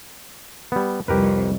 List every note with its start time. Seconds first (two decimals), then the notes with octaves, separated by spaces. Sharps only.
0.72 G3 B3
1.08 C2 F2 G4 A#4 B4